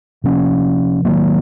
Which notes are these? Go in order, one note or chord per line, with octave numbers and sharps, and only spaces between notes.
C3 F3 A#3 C#4
D#3 F#3 A#3